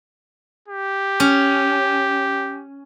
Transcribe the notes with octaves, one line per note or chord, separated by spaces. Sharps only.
G4
C#4